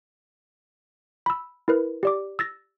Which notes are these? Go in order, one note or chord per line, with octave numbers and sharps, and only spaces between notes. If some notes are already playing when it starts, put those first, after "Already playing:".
B5 E6
E4 A#4 B4
G4 D5 D6
E6 A6 A#6